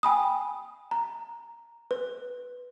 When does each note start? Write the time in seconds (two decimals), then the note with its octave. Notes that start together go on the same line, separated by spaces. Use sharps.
0.03 G5 G#5 B5 D#6
0.91 A#5
1.91 B4